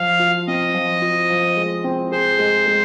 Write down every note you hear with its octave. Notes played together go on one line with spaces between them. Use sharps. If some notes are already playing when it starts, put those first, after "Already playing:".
Already playing: F3 F5
F4
C4 D#5
F3
F4
F3
G#3
C4
G#4 C5
G#3
G#3